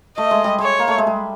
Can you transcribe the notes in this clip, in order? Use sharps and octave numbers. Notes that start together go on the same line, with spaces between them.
A3 D#5
G#3
G3
G#3 C#5
A#3
A3
G#3
G3